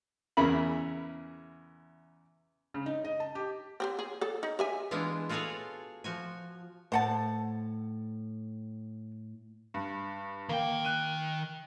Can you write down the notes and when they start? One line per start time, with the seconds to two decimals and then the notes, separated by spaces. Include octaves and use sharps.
0.37 E2 C#3 E4 G#4 A#4 B5
2.74 C#3
2.86 D#4
3.05 D#5
3.20 A5
3.35 G4
3.80 C4 G4 C5
3.99 G#4
4.21 G#4 A4
4.43 D#4
4.59 G4 E5 G#5
4.91 E3 G#3 B3 D4 E4 F4
5.29 F4 F#4 G#4 A4 C#5 F5
6.04 F3 F#4 G#5
6.92 A2 C5 F#5 A5
9.74 G2
10.49 D#3 A#3 G5
10.85 F#6 D#7